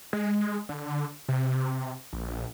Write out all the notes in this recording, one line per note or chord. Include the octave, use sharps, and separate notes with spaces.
G#3
D3
C3
A#1